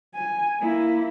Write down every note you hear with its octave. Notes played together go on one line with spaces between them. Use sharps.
G#5
A#3 E4